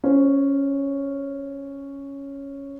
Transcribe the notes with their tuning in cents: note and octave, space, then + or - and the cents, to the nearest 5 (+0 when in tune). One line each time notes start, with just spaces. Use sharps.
C#4 +0 C5 +20